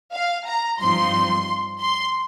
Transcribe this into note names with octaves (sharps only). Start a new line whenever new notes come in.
F5
A#5
G2 F3 C4 D#4 C6
C6